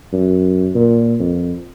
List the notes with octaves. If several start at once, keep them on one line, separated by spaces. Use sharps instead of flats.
F#2
A#2
F2